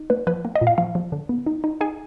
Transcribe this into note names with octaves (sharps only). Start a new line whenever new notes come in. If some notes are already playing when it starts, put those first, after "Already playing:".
Already playing: D#4
A#3 B4
F3 B4
A#3
D#5
A#2
F5
F3 F5
F3
D3
B3
D#4
D#4
D#4 G#4